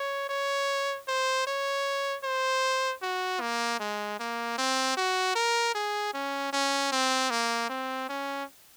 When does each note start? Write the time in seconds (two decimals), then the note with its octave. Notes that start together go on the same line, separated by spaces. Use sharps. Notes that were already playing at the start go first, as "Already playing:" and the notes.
Already playing: C#5
0.29 C#5
1.08 C5
1.47 C#5
2.24 C5
3.02 F#4
3.41 A#3
3.80 G#3
4.19 A#3
4.58 C4
4.97 F#4
5.36 A#4
5.75 G#4
6.14 C#4
6.53 C#4
6.92 C4
7.30 A#3
7.69 C4
8.09 C#4